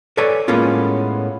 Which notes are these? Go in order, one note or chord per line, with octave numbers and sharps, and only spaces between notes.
A4 B4 C#5 D5 G#5
A2 G#3 A#3 B3 C#4 F4